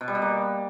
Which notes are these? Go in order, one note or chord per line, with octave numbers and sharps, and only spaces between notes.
B2
G3
B2
A#3